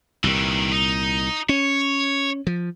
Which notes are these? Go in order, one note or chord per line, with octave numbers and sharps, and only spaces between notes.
C2 A#2 D#3 E3
D#4
C#4 C#5
F3